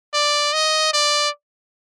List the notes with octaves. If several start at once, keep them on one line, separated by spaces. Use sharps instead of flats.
D5
D#5
D5